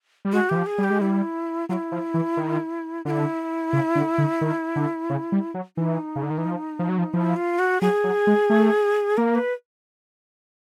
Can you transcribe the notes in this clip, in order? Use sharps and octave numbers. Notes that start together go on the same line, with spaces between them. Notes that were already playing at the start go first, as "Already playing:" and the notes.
G3
G#3 F#4
E3 G4
F3
G#4
G3
G4
G#3
G3 E4
F#3 F4
E4
F3
E3
D#3
D3 F4
E4
C#3
D3
D3
D#3
D3
C#3
G3
F#3
E3 D#4
C#3
D3
D#3
E3
F3
F3
F#3
F3
F3 E4
F4
F#4
F#3 G#4
F#3
G#3
A3
A#3 A#4
B4